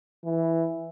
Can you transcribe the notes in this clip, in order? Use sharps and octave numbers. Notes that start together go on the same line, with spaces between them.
E3